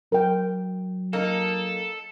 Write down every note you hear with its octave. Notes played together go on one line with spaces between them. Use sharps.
F#3 A#4 G5
A#3 D#4 A4